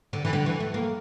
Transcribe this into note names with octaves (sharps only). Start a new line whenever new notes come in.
D3
E3
D3
E3
A3
A#3